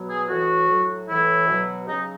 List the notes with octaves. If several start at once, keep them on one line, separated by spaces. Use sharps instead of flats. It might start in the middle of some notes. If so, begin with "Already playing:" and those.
Already playing: B2 F#3
G#4
A2 E3 F#4
A2 F#3
A2 E3 E4
B2 F#3
C#3 F#3 D#4